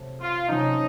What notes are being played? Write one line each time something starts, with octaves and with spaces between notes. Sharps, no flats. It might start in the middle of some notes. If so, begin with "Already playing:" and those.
Already playing: C3 F#3 A3
F4
C3 F#3 A3 C#4 D#4